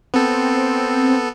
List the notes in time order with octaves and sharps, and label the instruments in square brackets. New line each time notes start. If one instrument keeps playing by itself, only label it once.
[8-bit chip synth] B3 A4 [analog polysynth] C4